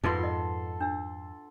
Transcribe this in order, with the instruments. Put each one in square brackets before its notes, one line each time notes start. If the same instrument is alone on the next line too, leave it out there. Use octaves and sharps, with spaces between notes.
[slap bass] F2 G#2 [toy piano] F4 B4 D6 [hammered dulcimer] A4 F#5 C6
[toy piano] F4 D#5
D4 E6